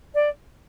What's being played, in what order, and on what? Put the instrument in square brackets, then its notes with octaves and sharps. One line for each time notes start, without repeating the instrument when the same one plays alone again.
[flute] D5